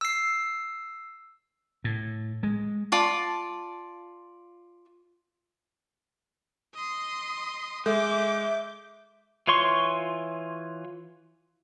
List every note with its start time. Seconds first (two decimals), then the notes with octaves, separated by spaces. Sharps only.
0.01 E6 C7
1.84 A2
2.43 G#3
2.92 F4 D5 A5
6.75 D#5 C6
7.86 G#3 A4 E5 D6 G6
9.47 E3 F4 C#5 C6 C#6